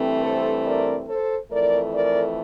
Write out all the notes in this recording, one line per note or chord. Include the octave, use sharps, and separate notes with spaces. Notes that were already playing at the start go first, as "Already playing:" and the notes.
Already playing: G2 E3 A3 C4
A4 C5
A#4 D5
A4 C5
F2 E3 A3 A#4 D5
A#4 D5